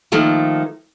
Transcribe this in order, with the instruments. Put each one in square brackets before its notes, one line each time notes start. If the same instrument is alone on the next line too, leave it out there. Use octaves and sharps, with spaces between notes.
[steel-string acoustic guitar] D#3 F3 A3 A#3